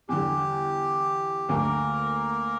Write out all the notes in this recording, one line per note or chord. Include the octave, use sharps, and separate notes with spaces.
E2 D3 G3 G4
D2 D3 A3 A#3 A#4